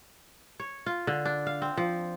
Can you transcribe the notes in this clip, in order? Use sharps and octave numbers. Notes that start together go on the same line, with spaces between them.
C#5
F4
D3
D4
F5
C4
F3